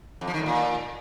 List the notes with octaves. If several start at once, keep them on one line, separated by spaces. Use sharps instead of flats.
F2
F3
D#3
A2
A#2